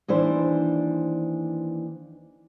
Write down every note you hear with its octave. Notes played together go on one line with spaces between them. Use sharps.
D#2 E3 D4 C5